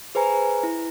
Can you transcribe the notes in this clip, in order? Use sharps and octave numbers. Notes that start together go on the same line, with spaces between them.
G#4 B4 C5 G#5 A#5
E4